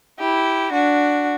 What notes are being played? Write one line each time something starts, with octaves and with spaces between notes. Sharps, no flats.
E4 G4
D4 F#4